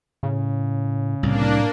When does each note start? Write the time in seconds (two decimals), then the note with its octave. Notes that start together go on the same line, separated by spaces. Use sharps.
0.23 A2 C#3
1.23 C2 A2 A#3 D4